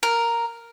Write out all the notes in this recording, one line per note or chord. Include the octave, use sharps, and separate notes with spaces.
A#4